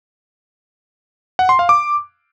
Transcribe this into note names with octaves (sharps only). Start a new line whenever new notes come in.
F#5
C6
F5
D6